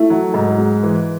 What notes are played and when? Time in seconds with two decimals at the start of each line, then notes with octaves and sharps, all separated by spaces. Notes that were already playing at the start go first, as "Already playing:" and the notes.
Already playing: A3 E4
0.10 F#3
0.34 G#2
0.58 G#3
0.83 E3